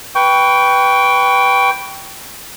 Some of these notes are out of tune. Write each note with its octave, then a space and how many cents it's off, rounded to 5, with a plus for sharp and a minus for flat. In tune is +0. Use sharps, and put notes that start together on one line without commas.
B4 +0 G5 +0 C#6 +25